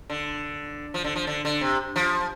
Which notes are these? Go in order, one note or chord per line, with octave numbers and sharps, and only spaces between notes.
D3
F3
D3
F3
D3
D3
C3
F3